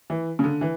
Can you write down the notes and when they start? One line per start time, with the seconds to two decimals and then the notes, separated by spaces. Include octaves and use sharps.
0.10 E3
0.39 C#3
0.44 D3
0.61 E3